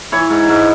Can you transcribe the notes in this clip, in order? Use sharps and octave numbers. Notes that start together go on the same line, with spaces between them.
E3 C#5
G#2
G#2